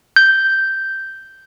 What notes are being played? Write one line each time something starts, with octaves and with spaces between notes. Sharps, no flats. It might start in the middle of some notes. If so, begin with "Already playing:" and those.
G6